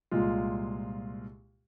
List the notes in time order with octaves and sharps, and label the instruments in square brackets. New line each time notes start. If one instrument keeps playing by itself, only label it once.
[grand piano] C2 A#2 G#3 F4